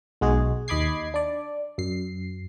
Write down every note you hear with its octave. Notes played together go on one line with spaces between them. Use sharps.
B1 G#3 F#4 G#4
D#2 D#5 B5 D6 G#6 C7
D4 D5
F#2 C7